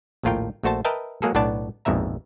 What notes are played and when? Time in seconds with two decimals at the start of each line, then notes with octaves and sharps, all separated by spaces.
0.23 A#1 D#2 A2 F4 A#4 G5
0.63 A#1 A3 F#4 C5 A5
0.85 A#4 B4 D#5 E5 G5 A5
1.22 F#3 G#3 A#3 G#4 A4
1.35 B1 A2 B3 D4 D5 A5
1.85 A#1 F2 G#2 B2 E5 A#5